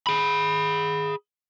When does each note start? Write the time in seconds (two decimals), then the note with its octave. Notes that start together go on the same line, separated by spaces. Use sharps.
0.07 G#4 B5